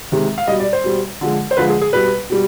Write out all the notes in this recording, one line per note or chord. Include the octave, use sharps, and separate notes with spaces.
C3 D#3 G#3
F5
B2 G3 D#5
D5
C5
B2 G3
D3 F3 G#3
C5
D3 F3 G#3 B4
G#4
G#4
B2 G3 B4
B2 G3